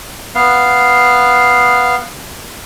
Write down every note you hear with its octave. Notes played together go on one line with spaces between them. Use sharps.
B3 F5